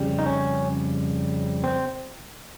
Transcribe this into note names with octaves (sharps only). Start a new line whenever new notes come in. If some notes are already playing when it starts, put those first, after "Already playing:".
Already playing: F2 C#3 G3
D#4
C#4
C4